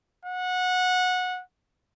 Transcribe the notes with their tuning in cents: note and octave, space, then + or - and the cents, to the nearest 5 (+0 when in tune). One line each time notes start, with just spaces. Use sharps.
F#5 -20